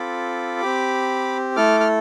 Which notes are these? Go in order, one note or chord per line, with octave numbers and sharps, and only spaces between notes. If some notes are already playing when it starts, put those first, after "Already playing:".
Already playing: C4 F4 A4 B5 D6
C4 G4
A3 E4 A4 D6 F6
F6